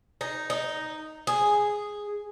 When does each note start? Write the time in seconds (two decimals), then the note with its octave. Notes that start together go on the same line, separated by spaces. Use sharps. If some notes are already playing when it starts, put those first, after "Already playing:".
0.21 D#4
0.50 D#4
1.27 G#4